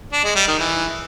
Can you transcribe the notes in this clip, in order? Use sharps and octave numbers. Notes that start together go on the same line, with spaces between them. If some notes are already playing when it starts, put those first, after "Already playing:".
D4
G#3
G3
D#3
E3